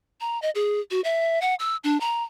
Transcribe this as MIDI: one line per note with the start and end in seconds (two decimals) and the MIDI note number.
0.21 0.40 82
0.42 0.50 75
0.55 0.80 68
0.91 1.01 66
1.04 1.40 76
1.42 1.55 78
1.60 1.76 88
1.84 1.98 62
2.01 2.23 82